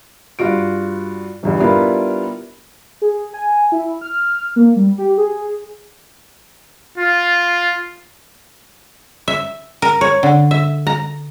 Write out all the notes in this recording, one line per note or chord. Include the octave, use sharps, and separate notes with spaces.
G2 F4 F#4 D7
G1 E2 G2
G3 B3 D4 E4 F4 A#4
G#4
G#5
E4
F6
A#3
G3
G4
G#4
F4
E5
A#4
C#5
D3
E5
A#5